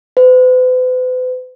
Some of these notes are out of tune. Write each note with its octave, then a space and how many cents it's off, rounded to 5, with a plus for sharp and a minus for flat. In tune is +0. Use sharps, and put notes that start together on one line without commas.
B4 +45